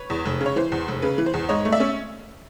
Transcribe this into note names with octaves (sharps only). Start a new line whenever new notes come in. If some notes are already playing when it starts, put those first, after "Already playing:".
Already playing: B4 C#5
E2
F1
C#3
C#5
E3 C5
E2
F1
C#3 B4
E3
C5
E2
G#2 C#5 D#5
A3
D5 E5
C#4